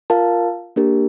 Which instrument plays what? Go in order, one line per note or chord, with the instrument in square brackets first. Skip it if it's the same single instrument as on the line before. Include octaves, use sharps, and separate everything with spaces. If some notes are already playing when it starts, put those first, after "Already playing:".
[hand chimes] F4 A#4 F5 A5
A#3 D4 G4 A#4